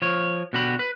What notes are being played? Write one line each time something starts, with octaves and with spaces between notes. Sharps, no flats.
F3 C#5
B2 D3 F#4 G4 B5
B4